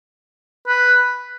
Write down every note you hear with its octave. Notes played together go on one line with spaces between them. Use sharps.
B4